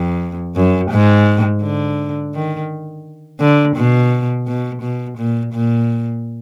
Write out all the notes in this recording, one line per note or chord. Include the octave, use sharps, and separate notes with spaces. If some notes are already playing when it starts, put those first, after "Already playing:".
Already playing: F2
F#2
G#2
D3
D#3
D3
B2
B2
B2
A#2
A#2